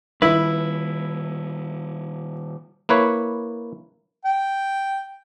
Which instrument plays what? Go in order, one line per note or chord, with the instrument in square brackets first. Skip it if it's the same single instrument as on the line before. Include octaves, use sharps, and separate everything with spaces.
[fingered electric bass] D#3 G3 [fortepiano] E4 [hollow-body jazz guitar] B4
[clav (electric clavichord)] A#3 E4 B4 C#5
[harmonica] G5